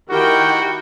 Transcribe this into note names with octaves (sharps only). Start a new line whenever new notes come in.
D#3 E4 F#4 G4 A#4 G5